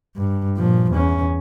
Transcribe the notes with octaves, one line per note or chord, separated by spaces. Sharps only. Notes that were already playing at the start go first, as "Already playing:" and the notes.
G2
A#2 F3
E2 C#4